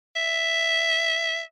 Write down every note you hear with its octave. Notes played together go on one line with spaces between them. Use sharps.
E5